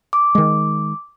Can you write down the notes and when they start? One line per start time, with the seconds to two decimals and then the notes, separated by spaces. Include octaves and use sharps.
0.13 D6
0.35 D#3 G#3